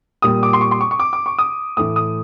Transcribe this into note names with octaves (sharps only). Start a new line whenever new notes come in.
A#2 G3 D#6
D6
C6
C#6
C6
C#6
C#6
D6
D6
C#6
D#6
A2 E3 A3 D#6
D#6